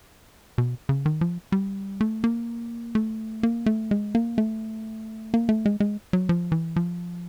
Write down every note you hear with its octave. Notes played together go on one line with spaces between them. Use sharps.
B2
C#3
D#3
F3
G3
A3
A#3
A3
A#3
A3
G#3
A#3
A3
A#3
A3
G#3
G#3
F#3
F3
E3
F3